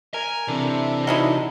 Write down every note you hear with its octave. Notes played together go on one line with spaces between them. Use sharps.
A#4 G#5
C3 E3 D4 A4
F#3 D#4 E4 D#5